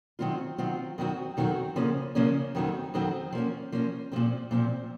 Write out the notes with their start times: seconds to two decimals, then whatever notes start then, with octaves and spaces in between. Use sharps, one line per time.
0.19 D#3 F#3 C4 F4
0.58 D#3 F#3 C4 F4
0.98 F2 D#3 F#3 C4 F#4
1.37 F2 D#3 F#3 C4 F#4
1.76 C#3 F3 A#3 C#4
2.15 C#3 F3 A#3 C#4
2.55 F2 D#3 F#3 C4
2.94 F2 D#3 F#3 C4
3.33 F3 A#3 C#4
3.72 F3 A#3 C#4
4.12 A#2 F3 C4
4.51 A#2 F3 C4